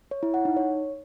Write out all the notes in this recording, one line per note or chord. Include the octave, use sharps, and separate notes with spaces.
C#5
E4
F#5
D#4
C#5